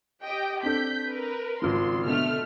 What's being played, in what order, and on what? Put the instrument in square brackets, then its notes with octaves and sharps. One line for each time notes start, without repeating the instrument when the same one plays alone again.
[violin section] G4 D#5 G5
[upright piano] C4 D4 A4 [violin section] G6 B6
[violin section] A#4 B4
[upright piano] G#1 C#3 F3 [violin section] C6
[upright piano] B2 D3 [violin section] A3 F6